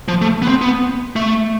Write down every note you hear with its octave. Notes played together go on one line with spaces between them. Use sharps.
F3
A3
B3
C4
B3
A3